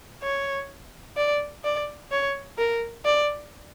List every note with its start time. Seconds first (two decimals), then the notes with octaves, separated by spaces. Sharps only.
0.23 C#5
1.17 D5
1.64 D5
2.11 C#5
2.58 A#4
3.05 D5